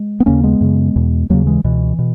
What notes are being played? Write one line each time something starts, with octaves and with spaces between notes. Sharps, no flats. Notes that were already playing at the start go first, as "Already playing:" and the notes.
Already playing: G#3
B3
D#2 C#3 A#3 C#4
G#3 B3
F#2 C#3
E2 B2
D#2 C#3 F#3 A#3
E3 G#3
C#2 B2 E3
B2